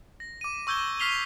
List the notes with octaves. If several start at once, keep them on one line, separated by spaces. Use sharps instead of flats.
A#6
D6 D#7
C#6 E6 G6 G#6 G7
C#6 F6 B6 C7 F7 G7